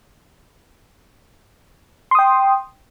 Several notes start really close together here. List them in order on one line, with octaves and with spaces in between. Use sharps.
C6 D#6 G5